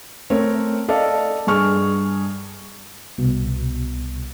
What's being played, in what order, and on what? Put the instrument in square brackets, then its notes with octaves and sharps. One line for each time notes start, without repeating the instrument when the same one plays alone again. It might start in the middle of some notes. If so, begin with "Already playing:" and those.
[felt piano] A3 C4 A#4 C#5
A4 D5 D#5 F5 A5
G2 G#4 C#6 F6
[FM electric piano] C2 B2